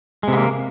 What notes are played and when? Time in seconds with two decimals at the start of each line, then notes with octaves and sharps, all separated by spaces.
0.23 G#3
0.28 C3
0.32 B3
0.37 A#3